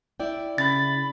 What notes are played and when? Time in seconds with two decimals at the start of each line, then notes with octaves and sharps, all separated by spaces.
0.20 E4 D5 G5
0.58 C#3 B5 A6